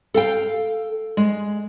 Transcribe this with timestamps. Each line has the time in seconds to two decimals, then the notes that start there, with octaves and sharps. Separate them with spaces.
0.14 A4 F5 G5
1.17 G#3